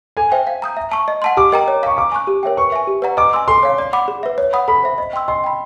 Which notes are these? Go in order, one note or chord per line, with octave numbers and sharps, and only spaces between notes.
A4 G#5
C5 E5 G5
F5
A#5 D#6 G6
E5
A5 C#6
D#5
F#5 A5 C6
G4 D6
A#4 D#5 G5 A#5
C#5
F5 A#5 C#6
F5 D6
G#5 C#6 F#6
G4
A#4 C#5 E5 G5
B4 C#6
E5 G#5
G4
B4 D5 F#5 A#5
D#5 D6
G#5 C6 E6
A4 C6
C#5 F5
D5
F#5 B5 D6
G#4
B4 E5
C#5
F#5 B5 D#6
A4 B5
C5 E5
D#5
G5 C6 E6
D#5 C6
G5 B5